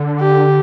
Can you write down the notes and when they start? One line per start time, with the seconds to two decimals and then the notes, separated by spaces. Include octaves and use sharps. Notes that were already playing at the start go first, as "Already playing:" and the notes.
Already playing: D3
0.20 G4